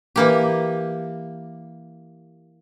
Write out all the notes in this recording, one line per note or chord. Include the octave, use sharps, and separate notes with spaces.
E3 A#3 G4